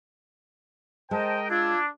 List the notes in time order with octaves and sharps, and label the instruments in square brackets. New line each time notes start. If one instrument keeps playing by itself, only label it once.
[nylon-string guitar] G#3 [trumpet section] A#4 D#5 G5 [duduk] C5 [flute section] A5
[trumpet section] D4 [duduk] F4 [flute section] E6 G#6